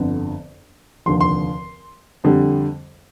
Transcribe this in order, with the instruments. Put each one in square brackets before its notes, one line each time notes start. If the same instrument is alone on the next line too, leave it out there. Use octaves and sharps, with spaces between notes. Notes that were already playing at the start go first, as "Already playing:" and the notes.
Already playing: [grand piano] G1 F2 D3
F1 D#2 D3 F3 C6
C6
F2 D3 G3